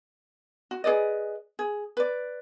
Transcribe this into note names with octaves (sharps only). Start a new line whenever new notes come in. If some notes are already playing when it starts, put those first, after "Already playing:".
F#4
G#4 B4 D5 D#5
G#4
B4 D5